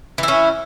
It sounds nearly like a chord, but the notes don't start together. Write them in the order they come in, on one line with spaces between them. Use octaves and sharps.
E3 E4 C#4